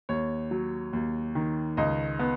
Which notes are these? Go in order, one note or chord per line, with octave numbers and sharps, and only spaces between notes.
D#2 C#5
F#3
D#2
D#3
C#2 D#5
B3